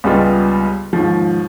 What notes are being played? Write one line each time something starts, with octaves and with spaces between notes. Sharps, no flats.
C#2 G3 G#3 B3 F4 D#5
D#2 G#2 F3